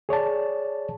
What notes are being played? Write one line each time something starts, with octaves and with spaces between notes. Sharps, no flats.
G#4 C#5 D5 A5